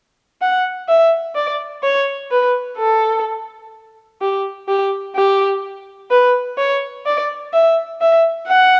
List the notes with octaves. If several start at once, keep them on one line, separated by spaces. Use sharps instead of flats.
F#5
E5
D5
C#5
B4
A4
G4
G4
G4
B4
C#5
D5
E5
E5
F#5